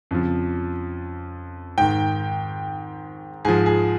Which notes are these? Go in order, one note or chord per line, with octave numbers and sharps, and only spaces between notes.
F2 C#3 F3
G#2 D#3 G5
G#2 F3 G#4
G#4